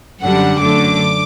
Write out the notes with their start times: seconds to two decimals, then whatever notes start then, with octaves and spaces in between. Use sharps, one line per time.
0.21 F#2 D3 G3 D4 F#5
0.60 F#2 D3 A3 D4 D6